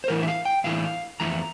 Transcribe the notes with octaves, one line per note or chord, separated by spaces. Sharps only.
C5
A2 E3 A3 E4 A#4
E5
F5
G5
A2 E3 A3 E4 F5
F2 E3 A3 E4 A#5